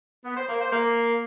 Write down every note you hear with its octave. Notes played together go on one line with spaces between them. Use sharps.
B3
C5
A#3
C5
A#3